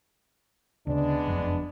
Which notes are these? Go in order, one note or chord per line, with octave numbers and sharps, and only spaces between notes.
D2 C#3 G#3 B3 D4
F#1 F2